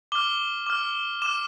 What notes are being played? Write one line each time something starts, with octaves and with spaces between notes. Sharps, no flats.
D6 F6 G7
D6 F6
D6 F6 E7